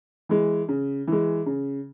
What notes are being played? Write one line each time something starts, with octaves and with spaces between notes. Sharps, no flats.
E3 G#3
C#3
E3 G#3
C#3